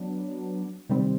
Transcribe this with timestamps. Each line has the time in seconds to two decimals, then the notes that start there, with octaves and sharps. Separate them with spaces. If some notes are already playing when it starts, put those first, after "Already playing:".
Already playing: F#3 B3 D4
0.89 C3 D#3 G3 C4